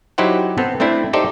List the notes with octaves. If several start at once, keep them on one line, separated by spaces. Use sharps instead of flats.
F#3 D#4 E4 G4 C5 F#5
B3 C4 A4
A3 C4 D4 E4
D#4 G4 A4 C5 D5 E5